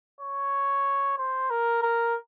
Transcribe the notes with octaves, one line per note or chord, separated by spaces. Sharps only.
C#5
C5
A#4
A#4